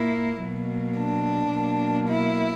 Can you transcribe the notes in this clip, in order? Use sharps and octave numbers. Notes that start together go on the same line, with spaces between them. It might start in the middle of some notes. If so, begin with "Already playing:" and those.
Already playing: A#2 A#3 E4
B2 F#3 A#3
D4
B2 F#3 A#3
E4